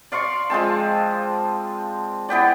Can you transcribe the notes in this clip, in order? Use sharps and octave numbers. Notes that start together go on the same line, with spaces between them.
D5 F5 C6 C#6
F3 G#3 C4 A5
E3 B3 G4 D5